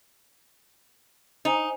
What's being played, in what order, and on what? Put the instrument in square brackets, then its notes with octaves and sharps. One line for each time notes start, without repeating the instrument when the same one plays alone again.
[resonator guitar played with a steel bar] D#4 [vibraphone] C5 G#5